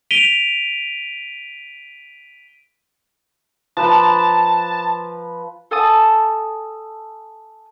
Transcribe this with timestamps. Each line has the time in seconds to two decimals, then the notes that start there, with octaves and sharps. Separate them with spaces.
0.11 B6 D7 D#7 F7 G7
3.77 F3 B4 A5 A#5
5.71 A4 G#5 A5 D#6